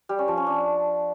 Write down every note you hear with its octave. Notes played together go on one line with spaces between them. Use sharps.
G3
C#4
F3
C#4
D4